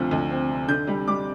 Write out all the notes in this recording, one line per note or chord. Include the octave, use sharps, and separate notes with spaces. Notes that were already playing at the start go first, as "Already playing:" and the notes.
Already playing: D2 C3 F3 C4
D2
C4
C3
D3 G6
G3
G3 D6